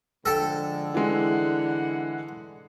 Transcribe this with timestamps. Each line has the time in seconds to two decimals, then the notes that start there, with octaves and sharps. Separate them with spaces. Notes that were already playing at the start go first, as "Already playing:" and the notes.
0.26 D3 F3 G#3 A4 G5 A5
0.94 E3 G#3 E4 F#5